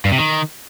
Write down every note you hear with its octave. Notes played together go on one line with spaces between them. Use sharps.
G2
C3
D#3